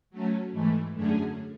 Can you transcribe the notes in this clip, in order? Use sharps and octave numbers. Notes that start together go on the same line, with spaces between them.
F#3 A3 C#4
G#2 E3 A3
F#2 D3 A3 C#4 G#4